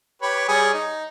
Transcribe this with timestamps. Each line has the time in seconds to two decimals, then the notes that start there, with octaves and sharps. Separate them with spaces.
0.22 G4 B4 C#5
0.49 G3 G#4 C#5
0.74 D#4